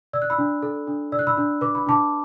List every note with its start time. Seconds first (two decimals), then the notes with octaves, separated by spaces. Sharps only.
0.13 D5 E6
0.22 F#6
0.30 B5 E6
0.38 D4
0.63 A4
0.87 D4
1.12 D5 E6
1.19 F#6
1.27 B5 E6
1.37 D4
1.61 B4 D6
1.75 B5
1.86 D4 A5 D6